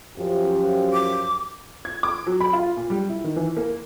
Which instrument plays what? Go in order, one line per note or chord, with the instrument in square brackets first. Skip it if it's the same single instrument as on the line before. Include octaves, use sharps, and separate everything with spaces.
[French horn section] F#2 F3 G4
[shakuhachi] D6
[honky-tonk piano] G#6
D6
F#3
B5
F4
A#2
G3
E4
D#3
E3
A#3